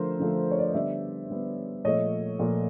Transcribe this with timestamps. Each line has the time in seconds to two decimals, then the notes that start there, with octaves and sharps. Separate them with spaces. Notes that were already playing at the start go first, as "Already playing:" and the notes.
Already playing: D3 F3 A3 A#4 C5
0.19 D3 F3 A3
0.51 C#5
0.59 D5
0.67 D#5
0.74 D3 G3 B3 D5 E5
1.30 D3 G3 B3
1.85 A#2 F3 A3 C#5 D#5
2.39 A#2 F3 A3